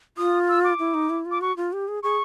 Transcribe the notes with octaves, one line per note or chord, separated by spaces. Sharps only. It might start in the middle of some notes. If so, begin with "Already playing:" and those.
F4 D#6
E6
D6
E4
D#4
E4
F4
D6
F#4 C#6
F4
G4
G#4
G#4 C#6